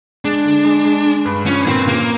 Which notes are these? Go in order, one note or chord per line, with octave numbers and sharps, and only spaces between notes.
G#3 D4
D3
G#3
G#3
G#3
G2
F3 C#4
A#2 C4
C#3 A#3